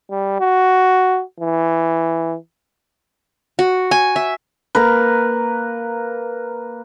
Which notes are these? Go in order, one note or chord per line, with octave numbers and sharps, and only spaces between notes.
G3
F#4
E3
F#4
G#5
E5
A#3 A#4 B4